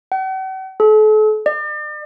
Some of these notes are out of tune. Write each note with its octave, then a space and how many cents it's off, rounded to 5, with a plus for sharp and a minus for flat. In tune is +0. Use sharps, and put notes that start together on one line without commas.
F#5 +45
A4 -40
D5 +40